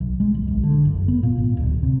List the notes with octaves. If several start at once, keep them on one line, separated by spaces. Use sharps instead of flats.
B1
G#3
A1
B1
D3
F#1
B3
A#2
G#1
D1
C3